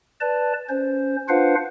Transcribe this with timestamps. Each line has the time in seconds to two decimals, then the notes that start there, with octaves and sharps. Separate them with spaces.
0.21 B4 D5 A5
0.69 C#4 C5
1.29 D4 F4 B4 C5 F5 F#5